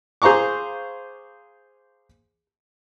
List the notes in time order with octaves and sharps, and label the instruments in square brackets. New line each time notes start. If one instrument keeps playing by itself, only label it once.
[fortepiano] G#4 C5 F5 A#5 C#6 D6